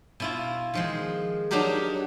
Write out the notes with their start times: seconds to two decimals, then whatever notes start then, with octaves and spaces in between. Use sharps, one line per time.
0.20 B2 E4 F4
0.74 D#3 F3 G#3
1.51 F#3 D4 D#4 F#4 G4 A#4